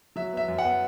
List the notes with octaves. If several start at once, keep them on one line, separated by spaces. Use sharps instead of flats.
F#3 E5
B3 E5
F#2
F#5
B3